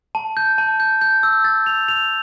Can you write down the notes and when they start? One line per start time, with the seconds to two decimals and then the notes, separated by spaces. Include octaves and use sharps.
0.15 A5
0.37 G6
0.58 A5
0.80 G6
1.01 G6
1.23 E6
1.44 A6
1.66 F7
1.88 F7